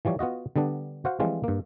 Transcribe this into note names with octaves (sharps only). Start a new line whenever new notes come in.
E3 F3 G3 C#5
B3 F4 F#4 D#5
D3 G3 B3 D4
F#4 C5 F5 F#5
E3 F3 G3 G#3 C4 F4
G2 A#3